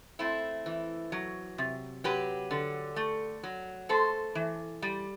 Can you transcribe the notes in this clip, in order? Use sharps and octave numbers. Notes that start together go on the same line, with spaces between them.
A3 C4 E4
E3
F#3
C3
F#3 G4 B4
D3
A3
F#3
A3 A4 C5
E3
G3